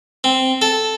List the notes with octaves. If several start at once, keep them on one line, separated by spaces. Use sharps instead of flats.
C4
A4